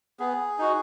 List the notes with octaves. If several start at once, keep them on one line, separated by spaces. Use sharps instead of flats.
B3 G#4
D#4 F#4